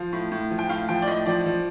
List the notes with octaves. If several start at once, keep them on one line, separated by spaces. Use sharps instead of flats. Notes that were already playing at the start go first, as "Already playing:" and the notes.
Already playing: F3 F5
A2
A2
F3
G5
A2 F5
F3 G5
D5
A2 D#5
F3 D5
F3